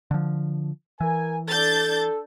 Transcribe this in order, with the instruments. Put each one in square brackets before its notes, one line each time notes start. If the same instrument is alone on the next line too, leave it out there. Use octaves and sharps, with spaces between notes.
[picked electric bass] D3 F3
[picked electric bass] E3 [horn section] A#4 G#5
[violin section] D4 G6 A6 [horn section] A4